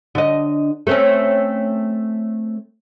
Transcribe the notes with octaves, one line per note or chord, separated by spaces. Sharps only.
D3 D#5
A3 C4 C#4